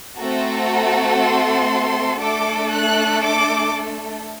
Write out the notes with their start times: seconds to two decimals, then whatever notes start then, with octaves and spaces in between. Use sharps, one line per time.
0.18 A3 C4 F#4 A4 A#5
1.20 C6
2.20 A3 D4 A4 D6
2.71 F#6
3.22 D6